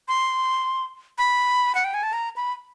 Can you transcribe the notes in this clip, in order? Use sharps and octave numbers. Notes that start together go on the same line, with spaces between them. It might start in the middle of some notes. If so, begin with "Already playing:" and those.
C6
B5
F#5
G5
G#5
A5
A#5
B5